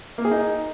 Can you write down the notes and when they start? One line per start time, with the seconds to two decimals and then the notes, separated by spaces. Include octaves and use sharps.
0.18 A#3
0.25 G#4
0.31 D#4